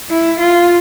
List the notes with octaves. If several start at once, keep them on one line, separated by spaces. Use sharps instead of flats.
E4
F4